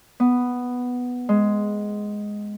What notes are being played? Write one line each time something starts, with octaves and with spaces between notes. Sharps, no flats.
B3
G#3